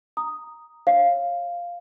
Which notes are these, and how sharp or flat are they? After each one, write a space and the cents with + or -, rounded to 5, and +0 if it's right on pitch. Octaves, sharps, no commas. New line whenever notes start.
A#5 +0 D#6 +0
C#5 -20 F5 +0